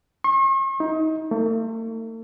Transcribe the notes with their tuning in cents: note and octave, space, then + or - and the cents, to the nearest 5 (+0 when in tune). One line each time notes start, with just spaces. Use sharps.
C#6 -45
D#4 +30
A3 +45